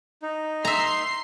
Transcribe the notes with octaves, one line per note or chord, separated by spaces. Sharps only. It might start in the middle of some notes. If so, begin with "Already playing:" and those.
D#4
E5 A#5 C6 C7